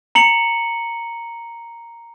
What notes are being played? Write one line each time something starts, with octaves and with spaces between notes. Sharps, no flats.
A#5 C#7 F#7